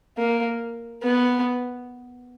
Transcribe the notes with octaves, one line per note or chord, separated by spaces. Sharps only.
A#3
B3